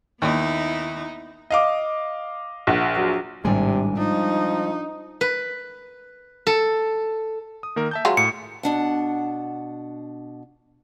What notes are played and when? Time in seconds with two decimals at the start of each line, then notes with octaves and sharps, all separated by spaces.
0.22 D#2 B3 D#4 E4
1.50 D#5 F5 D6
2.67 A#1 F#5
2.97 F#3
3.45 G#1 A2 C3 G3 G#3 D4 G#5
3.97 F3 D4 D#4
5.21 B4
6.47 A4
7.63 D#6
7.76 D#3 A#3 A#4
7.91 E5 A5 G6
8.05 F#3 G#3 F4
8.17 A2 C#7
8.63 B2 D4 F#5